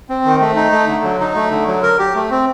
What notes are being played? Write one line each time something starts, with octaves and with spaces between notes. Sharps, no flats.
C4
D#3
A3
D#4
A3
D3
F#3
D#4
A3
D3
F#3
A#4
G4
A3
C4